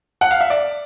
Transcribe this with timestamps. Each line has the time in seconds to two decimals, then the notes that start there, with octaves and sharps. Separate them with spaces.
0.21 F#5
0.31 F5
0.40 E5
0.50 D5